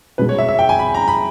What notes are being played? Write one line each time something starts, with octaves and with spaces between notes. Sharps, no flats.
B2 G#3 B4
C#5
E5
E5
G5
G#5
B5
A#5
B5